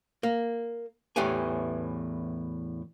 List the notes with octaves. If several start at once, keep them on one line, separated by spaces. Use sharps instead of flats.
A#3
E2 A2 E3 C#4 G4 G#5